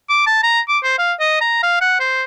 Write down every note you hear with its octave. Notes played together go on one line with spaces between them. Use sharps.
D6
A5
A#5
D6
C5
F5
D#5
A#5
F5
F#5
C5